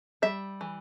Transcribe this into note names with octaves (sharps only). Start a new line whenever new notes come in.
G3 E5
E3